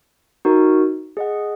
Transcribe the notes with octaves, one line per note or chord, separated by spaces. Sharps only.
D#4 F#4 A#4
G#4 D#5 F#5